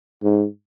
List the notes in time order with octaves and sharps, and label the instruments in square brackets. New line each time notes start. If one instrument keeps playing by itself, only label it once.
[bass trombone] G#2